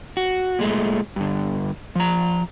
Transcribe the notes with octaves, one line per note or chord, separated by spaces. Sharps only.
F#4
A#2 G#3 A3
G2 D3
F3 A#5